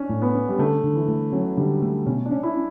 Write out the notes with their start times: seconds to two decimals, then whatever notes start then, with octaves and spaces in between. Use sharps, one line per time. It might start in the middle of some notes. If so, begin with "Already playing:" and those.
Already playing: C#4 D4
0.09 A2
0.22 B3
0.35 C#4
0.49 G3
0.59 D3 A3
0.84 D3
0.95 E3
1.08 A3
1.32 F#3 C#4
1.57 D3 G3
1.82 A3
2.06 B2 C#4
2.25 D4
2.31 C#4
2.43 E4